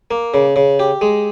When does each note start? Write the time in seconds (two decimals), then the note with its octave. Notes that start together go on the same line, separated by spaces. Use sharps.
0.11 A#3
0.34 C#3
0.56 C#3
0.79 G4
1.01 G#3